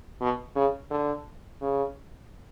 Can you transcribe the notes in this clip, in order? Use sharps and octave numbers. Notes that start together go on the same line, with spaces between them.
B2
C#3
D3
C#3